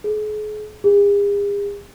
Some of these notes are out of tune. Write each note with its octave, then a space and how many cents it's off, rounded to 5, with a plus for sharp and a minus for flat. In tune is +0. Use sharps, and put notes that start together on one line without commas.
G#4 +40
G#4 -45